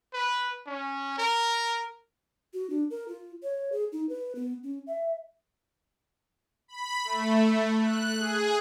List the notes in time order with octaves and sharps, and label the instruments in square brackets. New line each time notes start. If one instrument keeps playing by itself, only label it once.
[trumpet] B4
C#4
A#4
[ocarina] F#4
D4
A#4
F4
C#5
G#4
D#4
B4
B3
C#4
E5
[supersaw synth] B5
A3
F#6
G#4